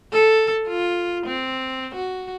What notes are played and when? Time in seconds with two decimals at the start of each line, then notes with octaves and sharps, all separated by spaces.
0.13 A4
0.68 F4
1.26 C4
1.95 F#4